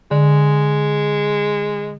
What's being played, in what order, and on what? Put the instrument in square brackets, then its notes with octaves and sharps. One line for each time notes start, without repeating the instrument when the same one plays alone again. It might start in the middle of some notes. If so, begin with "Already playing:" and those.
[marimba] D3 [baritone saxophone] G#3